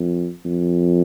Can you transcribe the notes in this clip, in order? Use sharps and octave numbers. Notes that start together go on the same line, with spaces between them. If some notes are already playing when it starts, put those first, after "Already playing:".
Already playing: F2
F2